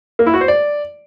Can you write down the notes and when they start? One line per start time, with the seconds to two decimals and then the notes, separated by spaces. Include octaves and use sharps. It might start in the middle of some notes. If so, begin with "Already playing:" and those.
0.19 A#3
0.26 E4
0.34 F#4
0.41 C5
0.48 D5